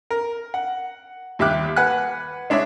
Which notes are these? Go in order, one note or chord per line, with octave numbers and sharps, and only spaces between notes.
A#4
F#5
D#2 G3 E5 D6 F#6
B4 F#5 G#5 F#6
G#3 D4 E4 C#5 E5